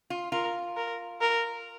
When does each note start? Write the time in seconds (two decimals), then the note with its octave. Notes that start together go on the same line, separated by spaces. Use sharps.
0.10 F4
0.32 F4 A#4
0.77 A#4
1.21 A#4